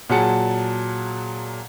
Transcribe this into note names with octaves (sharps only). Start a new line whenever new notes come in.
A#2 F#3 G#4 F#5 A5 C#7